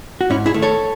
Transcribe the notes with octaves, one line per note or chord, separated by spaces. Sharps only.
F#4
G#2 C#4 E4
E4 G#4
D#3 A3
A4 C#5